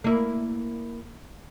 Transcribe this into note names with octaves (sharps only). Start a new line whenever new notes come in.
A#3 E4